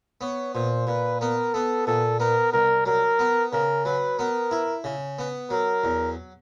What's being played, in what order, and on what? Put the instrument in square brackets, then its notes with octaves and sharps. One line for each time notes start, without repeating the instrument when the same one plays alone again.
[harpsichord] B3 [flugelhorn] C#5
[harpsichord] A#2 [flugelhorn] C5
[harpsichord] A#2 [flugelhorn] B4
[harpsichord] B3 [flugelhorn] A#4
[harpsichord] B3 [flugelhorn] A4
[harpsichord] A#2 [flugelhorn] A4
[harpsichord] B3 [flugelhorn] A#4
[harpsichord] C2 [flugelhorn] A#4
[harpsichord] F#3 [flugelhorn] A#4
[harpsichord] B3
[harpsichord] C#3 [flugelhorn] A#4
[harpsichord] F#3 [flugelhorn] B4
[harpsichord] B3 [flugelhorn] A#4
[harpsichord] E4
C#3
B3
[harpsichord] F#3 [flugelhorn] A#4
[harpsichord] E2